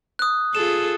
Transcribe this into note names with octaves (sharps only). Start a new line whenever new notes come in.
D#6 F#6
F4 G#4 A4 E7